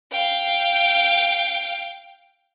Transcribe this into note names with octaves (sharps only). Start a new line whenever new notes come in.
F5 G5